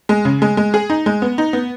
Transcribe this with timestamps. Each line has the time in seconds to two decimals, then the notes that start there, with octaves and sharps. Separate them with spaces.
0.09 G#3
0.25 C#3
0.42 G#3
0.57 G#3
0.74 G#4
0.90 D#4
1.06 G#3
1.22 B3
1.38 D#4
1.53 B3